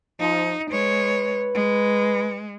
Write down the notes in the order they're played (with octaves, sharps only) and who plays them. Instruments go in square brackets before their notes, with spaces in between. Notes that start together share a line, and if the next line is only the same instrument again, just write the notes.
[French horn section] F3 [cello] D#4
[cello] G#3 C#5 [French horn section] B4
[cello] G#3